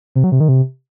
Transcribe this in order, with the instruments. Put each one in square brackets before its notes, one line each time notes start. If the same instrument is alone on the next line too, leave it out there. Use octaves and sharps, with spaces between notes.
[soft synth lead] C3
F#3
C3
D#3
C3